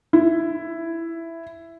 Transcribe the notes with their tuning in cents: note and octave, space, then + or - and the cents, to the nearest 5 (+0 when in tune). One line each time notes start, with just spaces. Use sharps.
E4 +10